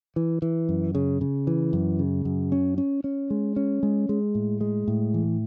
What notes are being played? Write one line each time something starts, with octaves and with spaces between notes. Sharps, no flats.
E3
E3
F#2
C#3
C#3
E3
F#2
C#3
F#2
C#4
C#4
C#4
G#3
C#4
G#3
G#3
A2
G#3
A2
E3